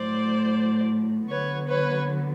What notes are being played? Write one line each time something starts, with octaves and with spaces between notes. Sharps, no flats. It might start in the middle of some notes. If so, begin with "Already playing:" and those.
Already playing: A2 F#3 A3 C5 D5
D3 F#3 B3 B4 C#5
B4 C#5